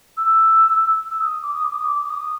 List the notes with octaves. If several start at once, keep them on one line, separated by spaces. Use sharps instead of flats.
E6
E6
D#6
D6
D#6
D6
D#6
D6
D6
D#6